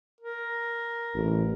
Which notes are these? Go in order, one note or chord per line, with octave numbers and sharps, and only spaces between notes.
A#4
A1